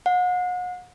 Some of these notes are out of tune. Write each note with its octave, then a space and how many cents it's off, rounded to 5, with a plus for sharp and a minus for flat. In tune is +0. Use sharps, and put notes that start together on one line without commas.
F#5 -40